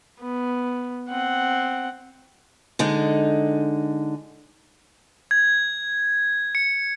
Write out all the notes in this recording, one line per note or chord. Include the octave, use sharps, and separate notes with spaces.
B3
C4 F#5
D3 G#3 D#4
G#6
C#7